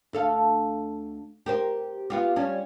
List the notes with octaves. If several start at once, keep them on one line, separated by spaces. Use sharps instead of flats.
D2 A4 F5
G4 A#4 C5
B3 F4 G4
G3 C#4